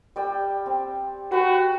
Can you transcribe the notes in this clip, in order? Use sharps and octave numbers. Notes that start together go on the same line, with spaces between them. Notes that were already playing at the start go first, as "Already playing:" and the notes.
G3 D5 G5
C4
F#4 B4 G5 B5